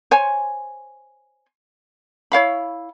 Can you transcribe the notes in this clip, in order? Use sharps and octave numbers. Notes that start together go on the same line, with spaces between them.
C5 C#5 G#5
E4 C#5 F5 B5